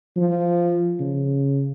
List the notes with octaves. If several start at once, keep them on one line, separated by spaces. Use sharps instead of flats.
F3
C#3